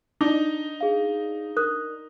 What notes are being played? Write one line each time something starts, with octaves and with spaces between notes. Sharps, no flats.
D4 D#4
G#4 F5
A#4 D#6 F#6